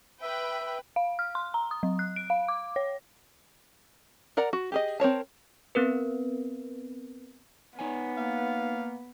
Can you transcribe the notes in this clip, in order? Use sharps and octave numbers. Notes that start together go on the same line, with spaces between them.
B4 E5 G5
F5
F6
C6
A#5
D#6
F#3
F#6
D7
F5
D6
C#5
A#4 D5 F#5 A#5
F#4
G4 G#4 D#5
C4 A#4 C#5 A5
B3 C4 A#4 B4
B3 D#4 C#5 G#5
A#3 F5